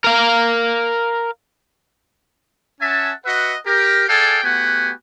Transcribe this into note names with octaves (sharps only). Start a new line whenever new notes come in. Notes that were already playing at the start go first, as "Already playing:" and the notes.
A#4 F5
C#4 E5 F#5 G#5 A5
F#4 B4 D#5 E5 F#5
G4 A#4
G#4 A4 D5 F5 G5 G#5
A3 B3 F#4 G4 F#5 G#5